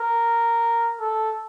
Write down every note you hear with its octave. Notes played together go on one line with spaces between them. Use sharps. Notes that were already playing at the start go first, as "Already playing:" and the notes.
Already playing: A#4
A4